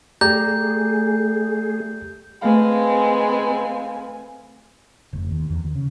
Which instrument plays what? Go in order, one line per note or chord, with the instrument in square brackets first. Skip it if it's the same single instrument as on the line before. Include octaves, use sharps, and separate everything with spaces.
[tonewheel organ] A3 G#4 [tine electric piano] G4 D5 A#5 [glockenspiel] G6
[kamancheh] G#3 B4 [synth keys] A3 F5 [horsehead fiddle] C4 G#5
[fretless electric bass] F1
D#2
E2
D#2
C#3